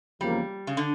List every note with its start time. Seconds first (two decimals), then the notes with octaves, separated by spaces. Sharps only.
0.21 E2 C#3 F3 G3 A#3
0.67 C#3
0.77 D3